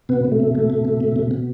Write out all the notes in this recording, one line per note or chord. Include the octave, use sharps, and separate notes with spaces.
B2 B3
B2
A3
B2
B2 A3
B2
B2
B2
B2
B2